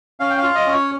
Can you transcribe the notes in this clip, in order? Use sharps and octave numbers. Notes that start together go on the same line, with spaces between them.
C#4 F5
G5
F5
F4
D#5
C#4
C#5